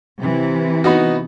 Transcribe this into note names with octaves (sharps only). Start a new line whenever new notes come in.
C3 E3
B3 D#4 F#4